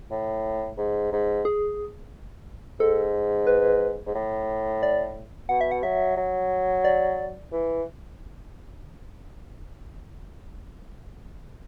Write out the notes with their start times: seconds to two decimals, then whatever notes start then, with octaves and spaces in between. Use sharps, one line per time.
0.11 A2
0.78 G#2
1.12 G#2
1.45 G#4
2.80 G#2 A4
3.47 B4
4.07 G#2
4.15 A2
4.83 D5
5.49 B2 F#5
5.61 E5
5.71 F#5
5.83 F#3 E5
6.17 F#3
6.85 D5
7.52 E3